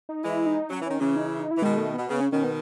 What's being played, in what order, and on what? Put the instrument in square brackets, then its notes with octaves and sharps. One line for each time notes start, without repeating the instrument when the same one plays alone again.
[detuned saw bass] D#4
[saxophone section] E3 G#3 [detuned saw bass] E4
[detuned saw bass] D#4
[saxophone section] F#3 [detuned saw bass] C#4
[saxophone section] E3
[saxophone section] D#3 [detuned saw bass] C#4
[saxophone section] C#3 E3 [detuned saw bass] C#4
[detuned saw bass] D#4
E4
D#4
E4
[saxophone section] E3
[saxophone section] B2 D#3 [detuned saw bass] G#3
[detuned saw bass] A3
[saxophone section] B2 [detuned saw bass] B3
[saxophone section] C#3 [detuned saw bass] B3
[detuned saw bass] C#4
[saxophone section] B2 D#3 [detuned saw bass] C#4
[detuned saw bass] B3